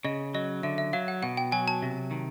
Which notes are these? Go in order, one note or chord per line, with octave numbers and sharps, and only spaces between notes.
C#3 D#5
F#3 D#5
D3 E5
E5
F#3 F5
F#5
B2 F#5
G5
F#3 G#5
A5
C3
D#3